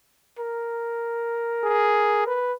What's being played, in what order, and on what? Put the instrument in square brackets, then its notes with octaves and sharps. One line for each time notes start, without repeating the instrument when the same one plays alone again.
[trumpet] A#4
[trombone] G#4
B4